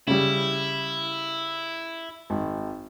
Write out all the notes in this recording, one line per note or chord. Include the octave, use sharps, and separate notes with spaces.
C#3 G3 E4
G#1